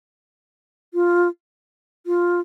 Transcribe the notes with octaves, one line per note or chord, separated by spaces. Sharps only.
F4
F4